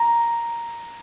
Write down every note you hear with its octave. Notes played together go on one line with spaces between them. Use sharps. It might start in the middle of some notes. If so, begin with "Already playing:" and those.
Already playing: A#5